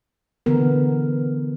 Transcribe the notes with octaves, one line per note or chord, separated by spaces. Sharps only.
D3 E3 B3 A#4